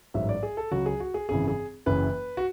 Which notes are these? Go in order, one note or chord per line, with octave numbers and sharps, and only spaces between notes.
A1 G#2 F#3 E5
D5
G#4
A4
C#2 C#3 F#3 F#4
G#4
F#4
G#4
G#1 F#2 C#3 E3 G#4
G#4
F#1 F#2 E3 B4
F#4